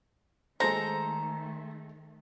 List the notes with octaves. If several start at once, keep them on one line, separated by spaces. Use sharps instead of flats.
D#3 G#3 A3 A4 C5 A#5